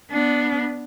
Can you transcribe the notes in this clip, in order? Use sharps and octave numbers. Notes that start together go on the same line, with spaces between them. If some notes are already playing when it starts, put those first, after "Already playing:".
B3 D4